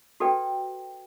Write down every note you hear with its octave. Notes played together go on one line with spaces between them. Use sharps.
F#4 A4 B4 D5 G5